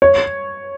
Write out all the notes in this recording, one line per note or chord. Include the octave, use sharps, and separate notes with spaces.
C#5